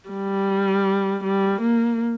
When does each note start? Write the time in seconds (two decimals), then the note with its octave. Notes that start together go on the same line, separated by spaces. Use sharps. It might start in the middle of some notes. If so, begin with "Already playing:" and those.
0.09 G3
1.24 G3
1.61 A#3